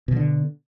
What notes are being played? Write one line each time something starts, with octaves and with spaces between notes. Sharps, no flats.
B2 D3 E3